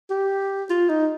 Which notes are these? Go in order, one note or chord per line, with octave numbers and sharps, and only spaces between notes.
G4
F4
D#4